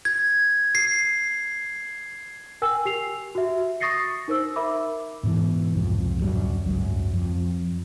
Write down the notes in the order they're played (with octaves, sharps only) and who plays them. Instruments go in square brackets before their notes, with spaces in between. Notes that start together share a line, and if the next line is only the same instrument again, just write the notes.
[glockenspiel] G#6
C7
[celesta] A#4 G5 G#5 E6
G4 C7 F7
F#4 E5
C#6 D#6 A6 A#6 C7 C#7
D#4 A#4 C5 E6
A#4 E5 B5 D6
[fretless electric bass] G#2 B2 E3
C2 F2 G#2
D1 F#2 F#3 G3
G#1 C#2 F#2 F#3
F2